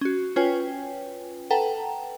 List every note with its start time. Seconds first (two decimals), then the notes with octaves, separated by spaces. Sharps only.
0.01 C#4 F#4
0.36 C#4 F4 B4 C#5 G5 G#5
1.50 A4 B4 F#5 G5 A5 A#5